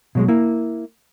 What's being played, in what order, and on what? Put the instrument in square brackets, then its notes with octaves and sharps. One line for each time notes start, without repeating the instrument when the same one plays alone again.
[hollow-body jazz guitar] B2 F#3 G#3
A#3 E4